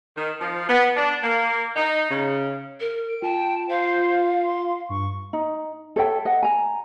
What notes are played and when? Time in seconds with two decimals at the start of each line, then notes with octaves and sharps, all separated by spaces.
0.17 D#3
0.41 F3
0.69 B3
0.97 D4
1.23 A#3
1.76 D#4
2.11 C#3
2.80 A#4
3.08 D7
3.22 F4 G5 A5
3.69 C5 F5
4.44 C6
4.89 G2 C#6
5.33 D#4
5.96 A4 C#5 E5 G5
6.25 D#5 F#5
6.43 G#5 A#5